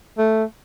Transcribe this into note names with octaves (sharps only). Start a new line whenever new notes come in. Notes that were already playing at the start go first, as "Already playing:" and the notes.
A3